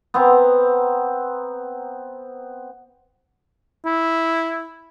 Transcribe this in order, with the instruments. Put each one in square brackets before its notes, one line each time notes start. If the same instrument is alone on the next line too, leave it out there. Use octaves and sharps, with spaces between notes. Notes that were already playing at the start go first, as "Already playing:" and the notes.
[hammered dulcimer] B3 C4 A#5
[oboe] E4